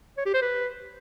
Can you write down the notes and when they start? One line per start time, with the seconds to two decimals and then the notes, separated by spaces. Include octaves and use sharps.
0.18 C#5
0.26 G4
0.34 C5
0.42 B4